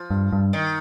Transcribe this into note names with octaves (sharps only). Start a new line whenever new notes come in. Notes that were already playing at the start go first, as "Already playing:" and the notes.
Already playing: F3
G2
G2
D#3